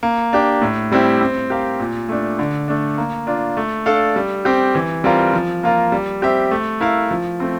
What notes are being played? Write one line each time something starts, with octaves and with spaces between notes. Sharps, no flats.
A#3
D4 G4
A2
G3 C4 E4 G4
C4
G4 A#4 F5
A#2
A3 D4
D3
A3 D4
A#3
D4 F4
A3
D4 A4 D5 F5
G3
C4 G4
E3
G3 C4 F4 A#4
F3
A#3 F4 A#4
G3
C4 G4 C5 E5
A3
E4 A#4 F5
F3
A3 C4